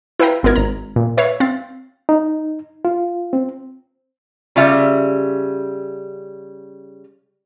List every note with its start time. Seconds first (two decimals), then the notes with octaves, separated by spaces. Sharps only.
0.19 E4 B4 F5 G5 A#5
0.43 G#1 B3 E4 A#4 G#6
0.56 G#1 A#5
0.96 A#2
1.17 B4 C#5 E5 F5 C#6
1.40 C4 F5 A6
2.09 D#4
2.85 F4
3.33 C4
4.56 C#3 G3 F4 E5